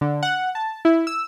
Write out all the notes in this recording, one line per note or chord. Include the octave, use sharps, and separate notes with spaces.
D3
F#5
A5
E4
E6